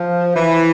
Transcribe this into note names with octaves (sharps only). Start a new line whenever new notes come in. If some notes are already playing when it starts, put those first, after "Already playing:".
Already playing: F3
E3